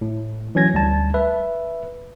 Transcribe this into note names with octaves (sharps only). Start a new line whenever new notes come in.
A2
E3 F#3 C#4 G#6 A#6
D2 G3 A5
B4 E5